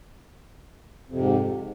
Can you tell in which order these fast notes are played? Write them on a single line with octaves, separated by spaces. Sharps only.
F2 C3 G#2